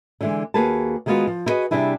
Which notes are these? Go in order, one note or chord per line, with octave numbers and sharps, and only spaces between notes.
D3 E3 G#3
D#2 A#3 F#4 G#4 B4 A5
D#3 G3 G#3 B3 F4 F#4
F3
E4 F#4 G#4 B4 D#5
C3 G3 D4 E4 G#4